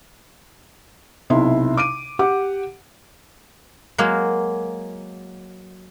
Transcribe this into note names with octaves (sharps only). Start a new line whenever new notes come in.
B1 C3 E4 C6
D6 D7 D#7
G4 F#5 D6
F#3 G#3 A#3